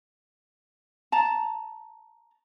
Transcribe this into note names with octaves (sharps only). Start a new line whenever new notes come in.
A5 A#5